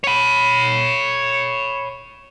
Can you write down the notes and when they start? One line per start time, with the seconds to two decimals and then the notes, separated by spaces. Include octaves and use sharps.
0.04 C#5 B5